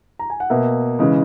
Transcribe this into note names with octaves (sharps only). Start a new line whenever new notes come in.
A#5
G#5
F#5
B2 A#3 E5
C#3 E3 G#3